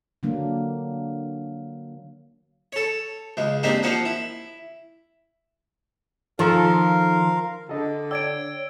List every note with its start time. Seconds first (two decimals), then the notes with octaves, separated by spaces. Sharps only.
0.23 D3 F#3 A#3 D4
2.72 A4 C#5
3.37 C#2 G#3
3.63 G#3 A#3 C4 D4 D#4 G4
3.83 F3 A#3 C#4 F4 F#4
4.05 E4
6.39 D#3 F3 F4 A4 A#4 F5
7.69 D3 A4 D#5
8.11 C#5 D5 G5 E6 G#6 D7